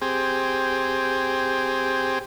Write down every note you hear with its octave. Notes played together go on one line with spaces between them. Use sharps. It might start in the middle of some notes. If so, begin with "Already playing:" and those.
C4 G4 G#4